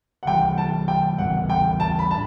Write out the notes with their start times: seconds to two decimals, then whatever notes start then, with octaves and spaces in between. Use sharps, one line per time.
0.23 F#5
0.27 E3 G3 D4 G5
0.58 A5
0.88 G5
1.18 A2 E3 G3 F#5
1.50 G5
1.80 A5
1.99 B5
2.11 D4 A5